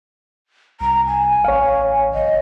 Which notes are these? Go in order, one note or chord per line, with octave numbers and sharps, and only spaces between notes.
C2 A#5
G#5
A1 C#5 F5
F#1 D#5